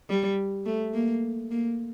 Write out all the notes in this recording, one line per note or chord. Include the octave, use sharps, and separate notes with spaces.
G3
A3
A#3
A#3